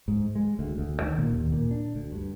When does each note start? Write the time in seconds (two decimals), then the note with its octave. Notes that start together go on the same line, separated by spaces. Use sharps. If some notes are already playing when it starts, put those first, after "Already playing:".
0.08 G#2
0.35 G#3
0.59 D2
0.78 D2
1.02 D#3
1.18 A#2
1.32 D#2
1.52 A#2
1.71 D4
1.95 D2
2.12 G2